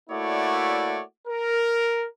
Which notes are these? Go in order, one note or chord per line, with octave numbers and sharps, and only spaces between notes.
A3 A#3 E4 F#4 C#5 D5
A#4